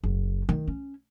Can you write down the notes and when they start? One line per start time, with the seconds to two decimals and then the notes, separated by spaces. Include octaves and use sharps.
0.03 F#1
0.49 D#3
0.67 C#4